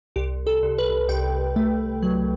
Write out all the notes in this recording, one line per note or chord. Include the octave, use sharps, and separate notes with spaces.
C2 G4
A4
C2
B4
C2 G5
A3
F#3